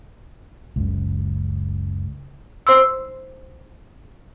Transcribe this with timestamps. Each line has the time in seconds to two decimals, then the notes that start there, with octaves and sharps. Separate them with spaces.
0.76 F#1 C#2
2.67 C5 C6 E6